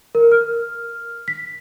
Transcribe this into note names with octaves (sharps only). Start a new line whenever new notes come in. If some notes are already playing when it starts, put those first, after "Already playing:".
A#4
F6
B6